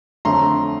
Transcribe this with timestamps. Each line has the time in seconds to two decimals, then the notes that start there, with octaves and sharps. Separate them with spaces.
0.25 F2 D3 F#3 A3 A#5 C6